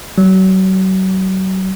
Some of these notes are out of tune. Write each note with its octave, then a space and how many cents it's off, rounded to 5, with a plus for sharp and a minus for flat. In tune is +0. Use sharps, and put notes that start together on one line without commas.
F#3 +35